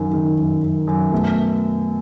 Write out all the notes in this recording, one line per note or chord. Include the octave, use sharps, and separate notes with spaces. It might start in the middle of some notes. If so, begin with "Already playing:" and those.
Already playing: F#2 D#3
D#3
F#2
F#2
F#2
B2 A3